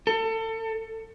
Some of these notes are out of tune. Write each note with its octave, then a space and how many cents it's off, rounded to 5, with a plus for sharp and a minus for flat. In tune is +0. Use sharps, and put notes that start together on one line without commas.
A4 +30